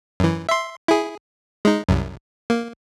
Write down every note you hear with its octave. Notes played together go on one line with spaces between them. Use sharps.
F#2 E3
E5 C6
E4 G#4
G#3 D#4
C2 F#2
A#3